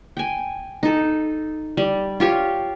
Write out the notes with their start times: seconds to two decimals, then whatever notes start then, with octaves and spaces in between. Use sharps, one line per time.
0.17 G5 G#5
0.83 D#4 A4
1.77 G3
2.20 F4 G4 C#5